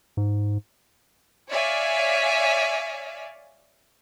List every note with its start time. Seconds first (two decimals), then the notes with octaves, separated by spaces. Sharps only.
0.17 G#2
1.50 C#5 D5 E5 F5 G#5